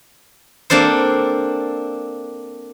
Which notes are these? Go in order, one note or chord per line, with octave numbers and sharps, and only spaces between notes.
A#3 C4 D4 A4 C5